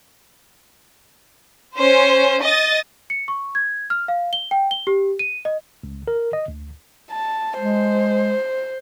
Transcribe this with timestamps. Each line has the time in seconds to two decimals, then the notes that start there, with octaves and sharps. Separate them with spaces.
1.76 C#4 C5
2.42 D#5 A6
3.10 C#7
3.28 C#6
3.55 G#6
3.90 F6
4.08 F5
4.33 G7
4.51 G5
4.71 G7
4.87 G4
5.19 D#7
5.45 D#5
5.83 C#2
6.08 A#4
6.33 D#5
6.48 D2
7.11 A5
7.59 G#3 C5